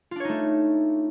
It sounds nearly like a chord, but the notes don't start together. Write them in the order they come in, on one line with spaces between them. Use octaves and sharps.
F4 D4 C#5 D#4 A3